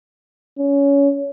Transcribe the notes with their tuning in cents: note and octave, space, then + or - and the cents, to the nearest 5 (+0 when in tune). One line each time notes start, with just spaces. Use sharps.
C#4 +20